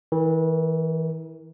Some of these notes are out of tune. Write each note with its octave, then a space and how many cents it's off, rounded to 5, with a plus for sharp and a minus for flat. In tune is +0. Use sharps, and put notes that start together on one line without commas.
E3 -30 A#4 +0